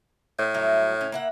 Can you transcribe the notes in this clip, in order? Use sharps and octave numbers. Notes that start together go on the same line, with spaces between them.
A2
F#3 G3 E4
C#4
A#3 E4 F#5